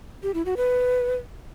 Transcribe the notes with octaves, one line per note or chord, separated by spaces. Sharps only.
G4
E4
F#4
B4